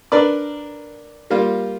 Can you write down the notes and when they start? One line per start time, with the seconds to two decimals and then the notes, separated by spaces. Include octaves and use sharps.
0.12 D4 A#4 B4 D5
1.30 G3 A#3 F4